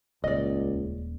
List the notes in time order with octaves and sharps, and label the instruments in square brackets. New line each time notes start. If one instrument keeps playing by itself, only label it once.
[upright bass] D#1 [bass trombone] C#2 [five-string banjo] D5 D#5